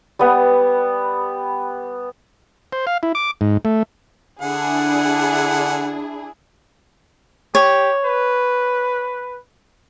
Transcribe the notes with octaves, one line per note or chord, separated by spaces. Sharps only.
G3 B3
C5
F5
E4
D6
G#2
A3
D3 D4 E4 G#4 F#5
G4 C#5
B4